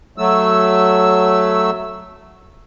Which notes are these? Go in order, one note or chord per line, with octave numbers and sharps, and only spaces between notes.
F#3 A3 E6